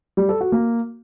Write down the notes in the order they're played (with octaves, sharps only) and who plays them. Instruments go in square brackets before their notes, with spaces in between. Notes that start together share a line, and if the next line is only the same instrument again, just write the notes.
[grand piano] G3
A4
F#4
A#3